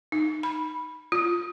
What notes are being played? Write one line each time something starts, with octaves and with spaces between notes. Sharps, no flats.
D#4
B5
F4